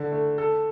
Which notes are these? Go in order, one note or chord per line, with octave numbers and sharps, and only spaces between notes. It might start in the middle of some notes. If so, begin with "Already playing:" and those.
Already playing: D3
A3
A4